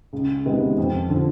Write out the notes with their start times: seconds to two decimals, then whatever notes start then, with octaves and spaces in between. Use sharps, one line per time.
0.13 C#2
0.45 C3 D#3 G#3 B3
0.78 F2
1.10 D3 F3